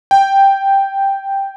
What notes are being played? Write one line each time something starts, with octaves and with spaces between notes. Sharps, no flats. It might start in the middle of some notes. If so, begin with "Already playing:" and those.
G5